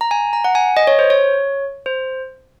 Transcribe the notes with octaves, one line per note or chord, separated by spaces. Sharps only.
A#5
G#5
A#5
F#5
G#5
D#5
C#5
C5
C#5
C5